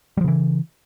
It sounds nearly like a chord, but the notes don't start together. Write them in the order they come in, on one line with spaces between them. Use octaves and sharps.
G3 F3 C#3 E3